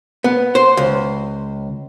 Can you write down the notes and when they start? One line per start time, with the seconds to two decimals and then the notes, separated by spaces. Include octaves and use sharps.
0.24 B3
0.55 C5
0.77 C#2